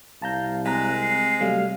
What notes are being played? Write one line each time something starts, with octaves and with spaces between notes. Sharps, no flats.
C2 F5 A5 A#5 G6
G#3 C4 A#5 F#6 B6
C7
C3 F#3 G3 A3 F5